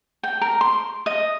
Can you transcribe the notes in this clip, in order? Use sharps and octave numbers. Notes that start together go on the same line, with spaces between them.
G5
A#4
C6
D#5